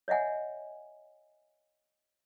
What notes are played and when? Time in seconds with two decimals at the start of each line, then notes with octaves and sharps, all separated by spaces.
0.08 C#5 D#5 E5 F#5 G#5